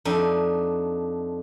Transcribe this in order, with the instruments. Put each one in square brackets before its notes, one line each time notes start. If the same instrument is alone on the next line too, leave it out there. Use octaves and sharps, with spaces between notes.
[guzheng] F2 D4 D#4 E5